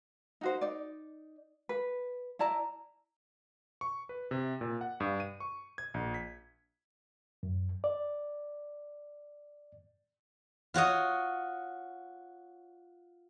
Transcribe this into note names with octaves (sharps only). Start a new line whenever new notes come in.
D#4 F#4 C5
D#4 D5
B4
E4 D5 A5 A#5
C#6
B4
C3
A#2
F#5
G2
D#7
C#6
G#6
A#1
B6
F#2
D5
F4 F#4 C#5 D#5